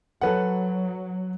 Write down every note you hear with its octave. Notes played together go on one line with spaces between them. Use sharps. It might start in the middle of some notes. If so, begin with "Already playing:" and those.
F#3 A4 B4 F#5